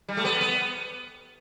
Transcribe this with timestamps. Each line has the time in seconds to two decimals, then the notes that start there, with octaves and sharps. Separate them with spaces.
0.09 G3
0.17 A3
0.25 B3
0.41 B3